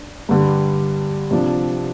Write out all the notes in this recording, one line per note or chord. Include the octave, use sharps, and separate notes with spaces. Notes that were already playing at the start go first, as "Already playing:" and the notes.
Already playing: D4
G2 D3 G3
C3 F3 D4